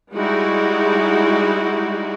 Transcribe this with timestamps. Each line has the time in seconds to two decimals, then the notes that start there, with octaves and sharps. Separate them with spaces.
0.14 G3 G#3 D#4 E4 F#4